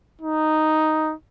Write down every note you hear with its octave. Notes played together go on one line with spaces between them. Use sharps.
D#4